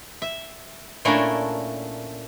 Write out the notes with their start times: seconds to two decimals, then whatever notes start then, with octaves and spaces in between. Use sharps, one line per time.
0.22 E5
1.05 A#2 A3 C#4 D4 E4 A#4